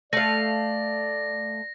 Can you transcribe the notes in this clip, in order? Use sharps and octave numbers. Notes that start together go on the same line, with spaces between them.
A3 D5 F5 A#6